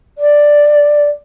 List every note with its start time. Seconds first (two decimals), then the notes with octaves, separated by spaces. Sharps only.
0.18 D5